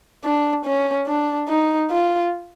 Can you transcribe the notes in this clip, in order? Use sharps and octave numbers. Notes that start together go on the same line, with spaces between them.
D4
C#4
D4
D#4
F4